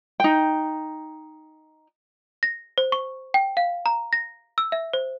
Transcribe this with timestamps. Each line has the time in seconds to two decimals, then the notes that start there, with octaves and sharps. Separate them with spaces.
0.20 D#4 G5
2.43 A#6
2.78 C5
2.92 C#6
3.34 G5
3.57 F5
3.86 A#5
4.13 A#6
4.58 E6
4.72 E5
4.94 C5